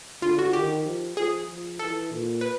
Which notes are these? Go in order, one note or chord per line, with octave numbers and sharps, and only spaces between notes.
D3 F4
F#4
D#3 G4
F3
F3 G#4
F3
E3 A4
A#2
B4